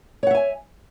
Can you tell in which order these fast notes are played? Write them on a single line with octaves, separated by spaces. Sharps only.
C#5 F#5 E5 G#5